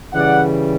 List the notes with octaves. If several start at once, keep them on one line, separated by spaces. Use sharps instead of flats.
C#3 E3 G3 D5 F#5